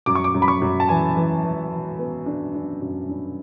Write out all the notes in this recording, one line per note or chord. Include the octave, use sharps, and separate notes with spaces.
F#2 D6
C#6
D6
F#2
B5
C#6
F#2
A5
E3 G#5
E3
E3
E3
B3
D4
D4
F#2
D4